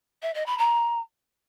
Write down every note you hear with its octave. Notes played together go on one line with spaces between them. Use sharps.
E5
D#5
B5
A#5